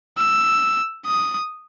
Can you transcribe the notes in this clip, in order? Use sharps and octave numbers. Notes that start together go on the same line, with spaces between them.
E6
D#6